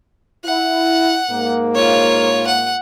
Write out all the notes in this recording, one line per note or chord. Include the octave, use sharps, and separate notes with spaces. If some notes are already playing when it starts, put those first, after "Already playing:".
E4 F#5
G#2 A#3
F4 C#5
F#5